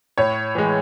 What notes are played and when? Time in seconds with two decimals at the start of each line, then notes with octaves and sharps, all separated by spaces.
0.18 A2 C#5
0.55 E3 G#3